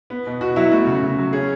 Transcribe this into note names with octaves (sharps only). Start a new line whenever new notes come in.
B3
B2
B2 F#4
F#3 E4
A3 F#4
C#3
C#3
F#3
C#4 G#4